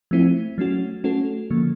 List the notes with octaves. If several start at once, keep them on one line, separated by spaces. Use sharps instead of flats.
F3 A3 C4 E4
F#3 A3 C#4 F#4
A3 C#4 F#4 A4
D3 F3 A#3